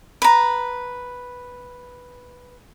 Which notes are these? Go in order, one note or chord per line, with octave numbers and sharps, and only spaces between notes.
B4 A#5